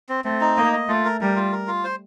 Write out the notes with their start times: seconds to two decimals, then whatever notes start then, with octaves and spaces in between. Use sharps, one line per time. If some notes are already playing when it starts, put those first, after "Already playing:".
0.09 C4
0.24 A3 C4
0.41 D#4
0.57 A#3 D#5
0.73 D#5
0.88 A3 F4
1.05 A#4
1.21 G3 A#4
1.36 F4
1.52 A#4
1.67 F4
1.84 C5